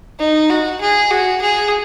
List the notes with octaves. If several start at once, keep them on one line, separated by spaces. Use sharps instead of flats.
D#4
F#4
G#4
F#4
G#4